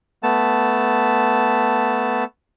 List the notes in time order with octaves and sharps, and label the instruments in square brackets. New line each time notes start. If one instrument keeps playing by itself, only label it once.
[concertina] A3 B3 A5